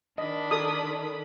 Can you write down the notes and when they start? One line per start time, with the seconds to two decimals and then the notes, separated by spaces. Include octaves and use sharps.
0.18 D#3 D4 D#5 B5
0.51 A4 A#4 D#6